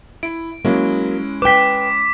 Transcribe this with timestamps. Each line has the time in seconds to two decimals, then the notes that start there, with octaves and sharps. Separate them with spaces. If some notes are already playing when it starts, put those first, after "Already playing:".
0.23 E4 D7
0.65 F#3 G#3 A#3 C#4 E4
1.42 B4 G5 D6 B6